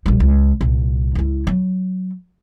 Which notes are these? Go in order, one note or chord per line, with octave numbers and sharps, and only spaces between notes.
A#1 G3
C#2
C2 A#2
C#2 E4
F#3